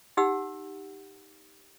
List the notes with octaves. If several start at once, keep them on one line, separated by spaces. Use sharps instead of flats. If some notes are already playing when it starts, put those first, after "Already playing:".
D#4 G4 F#5 E6